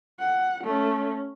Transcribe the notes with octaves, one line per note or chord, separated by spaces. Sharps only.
F#5
A3 C#4